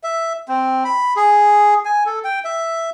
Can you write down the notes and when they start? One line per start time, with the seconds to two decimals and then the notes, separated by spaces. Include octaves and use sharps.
0.03 E5
0.48 C4
0.85 B5
1.16 G#4
1.85 G#5
2.06 A4
2.24 G5
2.44 E5